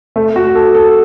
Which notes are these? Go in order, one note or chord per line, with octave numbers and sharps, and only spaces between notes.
A3
F#4
A4
A4